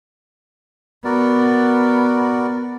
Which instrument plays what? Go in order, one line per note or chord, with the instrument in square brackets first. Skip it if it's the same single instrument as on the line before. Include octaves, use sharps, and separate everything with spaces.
[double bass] B3 [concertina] F#4 A#4 D5